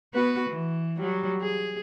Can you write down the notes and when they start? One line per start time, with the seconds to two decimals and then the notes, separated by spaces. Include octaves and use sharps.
0.14 B3 F#4 B4
0.50 E3
0.98 F#3 G3
1.42 G#4